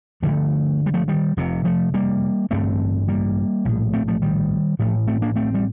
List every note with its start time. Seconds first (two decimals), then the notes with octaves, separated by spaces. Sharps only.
0.22 G1 F2 D3 F3 A3
0.86 G3
0.94 F3 A3
1.08 D#3 G3
1.37 F1 F2 C3
1.65 F3 A3
1.94 G3 A#3
2.50 A1 G2 D3 A3 C4
3.08 G3 A#3
3.65 A#1 A2
3.93 A3 C4
4.08 F3 A3
4.22 D#3 G3
4.79 A1 A2 F3 A3
5.08 A3 C4
5.22 A#3 D4
5.36 A3 C4
5.55 G3